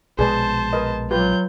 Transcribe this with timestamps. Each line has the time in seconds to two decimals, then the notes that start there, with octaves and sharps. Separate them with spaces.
0.19 A#1 B2 G#3 G#4 B4 C5 D5 A5
0.73 A#4 B4 D#5
1.11 F#3 F4 G4 B4 G6